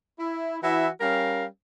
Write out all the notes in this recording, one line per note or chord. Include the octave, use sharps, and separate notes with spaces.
E4
E3 E4 F#4 E5
G3 C#4 A#4 F5